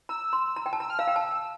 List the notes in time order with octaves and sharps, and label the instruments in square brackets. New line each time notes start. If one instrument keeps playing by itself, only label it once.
[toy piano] A#5 [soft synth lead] E6
[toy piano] C6
A#5
G5
A5
[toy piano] A#5 [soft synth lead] E6
[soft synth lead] F6
[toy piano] F5 [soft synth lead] E6
[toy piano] G5
A5